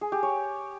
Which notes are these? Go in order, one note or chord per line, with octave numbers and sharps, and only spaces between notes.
G#4
G4
C#5